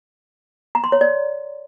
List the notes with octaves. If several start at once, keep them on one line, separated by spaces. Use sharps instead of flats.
A#5
C6
C#5
D5